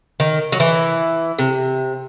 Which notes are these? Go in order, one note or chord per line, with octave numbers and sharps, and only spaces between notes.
D#3
F#3
E3
C3